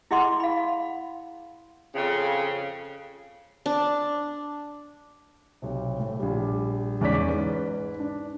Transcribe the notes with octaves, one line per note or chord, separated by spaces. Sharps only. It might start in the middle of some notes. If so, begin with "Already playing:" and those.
E4 G#4 D#5 F#5 C6 D6
F5 B5
F2 C#3
D4
B1 C3
A2
A#1 G3
E2 G#2 C#4 D5 D6 B6
G#2 B4
D4